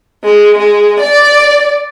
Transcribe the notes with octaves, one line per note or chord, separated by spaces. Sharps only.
G#3
G#3
D5